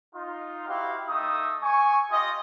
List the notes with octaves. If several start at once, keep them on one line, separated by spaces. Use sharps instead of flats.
D#4 F4
E4 F#4 G4 C5 F5
A3 D#4 E5 D#6
G#5 C#6
F4 G4 D#5